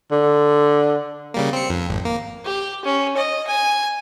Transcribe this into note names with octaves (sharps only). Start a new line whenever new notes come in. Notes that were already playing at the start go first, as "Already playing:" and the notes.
D3
C#3 G3 A#3
C4 C#7
F2
G#1
A#3
G4
C#4
D#5
G#5